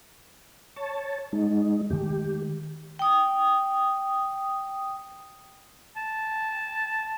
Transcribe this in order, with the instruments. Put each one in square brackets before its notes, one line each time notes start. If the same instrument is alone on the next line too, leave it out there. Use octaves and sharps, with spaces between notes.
[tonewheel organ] C#5 A5
G#3 D#4
[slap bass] D#3 G#3 A3 [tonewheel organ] G4
[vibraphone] G5 D#6
[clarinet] A5